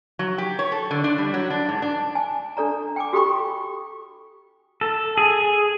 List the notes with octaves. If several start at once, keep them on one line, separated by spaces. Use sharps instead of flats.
F#3
G4
C#5
A4
D3
D4
G3
F#3
D4
G#2
D4
G#5 A5
D4 A4 D5 A#5
G5 G#5 D6
F#4 G4 A4 G5 B5 C#6
A4
G#4